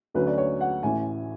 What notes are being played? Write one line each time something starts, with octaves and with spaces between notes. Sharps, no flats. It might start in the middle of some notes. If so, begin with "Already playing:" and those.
D2 D3 F#3 C#4 B4
D5
C#5
F#5
A1 A2 E3 G#5